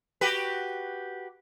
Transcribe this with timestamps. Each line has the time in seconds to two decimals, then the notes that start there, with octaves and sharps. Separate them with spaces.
0.21 F#4 G4 B4